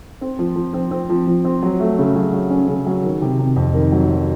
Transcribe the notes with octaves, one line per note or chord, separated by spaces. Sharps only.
C4
F3
F3
C4
C4
F3
F3
C4
F#3
A3
C#3
F#3
F#3
C#4
C#3
F#3
D#3
C3
C3
F2
D#3
F#3
F#3